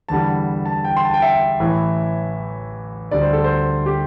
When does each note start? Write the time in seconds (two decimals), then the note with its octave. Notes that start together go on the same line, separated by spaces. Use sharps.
0.09 E2 D3 G3 A5
0.65 A5
0.85 G5
0.97 C6
1.05 A5
1.14 G5
1.22 E5
1.59 A1 A2 E3
3.11 D2 D3 G3 D5
3.22 C5
3.33 A4
3.44 C5
3.86 G4